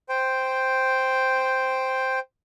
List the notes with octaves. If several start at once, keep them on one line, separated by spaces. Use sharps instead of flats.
C5 G5